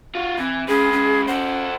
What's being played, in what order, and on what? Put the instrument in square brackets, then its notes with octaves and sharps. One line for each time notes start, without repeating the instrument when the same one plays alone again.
[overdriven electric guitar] F4 F#4
[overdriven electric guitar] E3 [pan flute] C4
[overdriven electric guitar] G#3 B4 [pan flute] C#4 [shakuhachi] G#4
[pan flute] C#4
[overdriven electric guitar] A4 C5 [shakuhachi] F#5